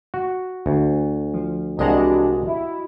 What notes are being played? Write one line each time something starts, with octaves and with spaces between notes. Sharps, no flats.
F#4
D2
F3
C2 E3 G#3 D4 F#4 G4 D#5 A#5
E4